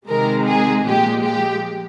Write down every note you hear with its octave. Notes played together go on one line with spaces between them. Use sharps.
C3 D#3 G#3 A#4
G#4
A#2 F3 G#3 G4
G4